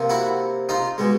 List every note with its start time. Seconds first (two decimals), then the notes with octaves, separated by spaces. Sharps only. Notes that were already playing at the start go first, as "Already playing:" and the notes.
Already playing: C3 F3 A#3
0.09 E4 F#4
0.69 D#4 F4
0.98 B2 G#3